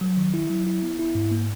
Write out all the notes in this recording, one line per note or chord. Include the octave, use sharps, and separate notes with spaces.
F#3
D#3
E4
F#3
E4
B3
E4
G#2
A#3